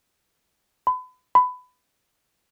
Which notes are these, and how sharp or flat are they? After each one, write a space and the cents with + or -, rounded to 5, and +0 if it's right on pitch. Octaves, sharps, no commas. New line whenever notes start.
B5 +35
B5 +20